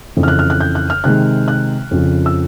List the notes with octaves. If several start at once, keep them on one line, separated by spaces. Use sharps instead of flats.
F2 C#3 E3
F6
F#6
F6
F#6
G6
F#6
F6
C3 D#3 G#3 F#6
F#6
F2 C#3 F3
E6